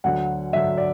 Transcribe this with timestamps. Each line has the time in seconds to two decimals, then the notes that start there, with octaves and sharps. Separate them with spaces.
0.04 D2 D3 F#3 F#5
0.53 D2 D3 F#3 E5
0.78 D5